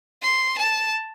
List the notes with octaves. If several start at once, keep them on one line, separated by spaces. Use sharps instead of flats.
C6
A5